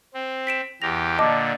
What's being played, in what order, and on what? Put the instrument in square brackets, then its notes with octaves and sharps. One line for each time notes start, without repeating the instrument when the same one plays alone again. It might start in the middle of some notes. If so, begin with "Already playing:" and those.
[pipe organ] C4
[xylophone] B6 D7 E7
[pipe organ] E2 G4 [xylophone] A#6 F7
[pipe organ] A#2 D3 [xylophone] D#5 A5 D6